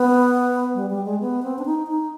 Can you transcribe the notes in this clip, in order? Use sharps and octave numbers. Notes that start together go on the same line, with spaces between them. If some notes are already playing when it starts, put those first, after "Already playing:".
Already playing: B3
G3
G3
G#3
B3
C4
D4
D#4
D#4